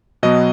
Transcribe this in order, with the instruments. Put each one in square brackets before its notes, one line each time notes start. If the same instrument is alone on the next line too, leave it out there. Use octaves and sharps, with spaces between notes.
[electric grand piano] B2 F#3 B3 D#5